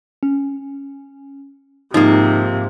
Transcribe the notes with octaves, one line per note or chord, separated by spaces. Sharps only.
C#4
G#2 C3 F3 A#3 D#4 D#6